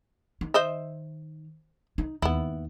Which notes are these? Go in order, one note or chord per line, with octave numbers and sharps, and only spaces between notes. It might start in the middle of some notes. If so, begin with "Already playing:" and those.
D#3
C5 D#5 E5
D#4
D#2 B3 E4